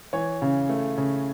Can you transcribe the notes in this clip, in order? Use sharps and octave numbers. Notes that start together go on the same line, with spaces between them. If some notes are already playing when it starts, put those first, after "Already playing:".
E3 C#5
C#3
A3
C#3